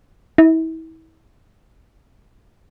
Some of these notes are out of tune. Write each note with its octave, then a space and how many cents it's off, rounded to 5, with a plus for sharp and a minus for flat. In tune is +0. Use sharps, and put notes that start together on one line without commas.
E4 -35